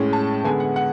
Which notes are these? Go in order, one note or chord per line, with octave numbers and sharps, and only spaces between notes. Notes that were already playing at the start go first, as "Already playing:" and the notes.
Already playing: A2 G#3 C#4
A5
D3 G#3 B3 G#5
F#5
F#5